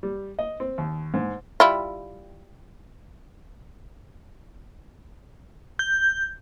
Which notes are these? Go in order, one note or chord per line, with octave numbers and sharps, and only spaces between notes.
G3
D#5
C4
D#2
G#2
G3 E4 F4
G6